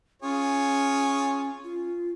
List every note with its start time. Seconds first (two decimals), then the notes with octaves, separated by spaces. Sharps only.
0.22 C#4 F4 G#4 C#5
1.64 F4